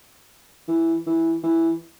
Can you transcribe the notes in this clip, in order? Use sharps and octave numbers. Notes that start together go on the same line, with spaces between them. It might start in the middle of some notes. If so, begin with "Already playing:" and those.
E3
E3
E3